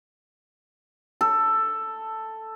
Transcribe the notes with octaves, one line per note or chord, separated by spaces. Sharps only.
A4